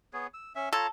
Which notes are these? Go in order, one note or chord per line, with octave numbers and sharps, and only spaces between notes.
B3 G#4 C#5
E6
C#4 E5
F4 A4 C#5 A#5